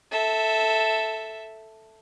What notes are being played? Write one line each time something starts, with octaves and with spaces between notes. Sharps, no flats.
A4 E5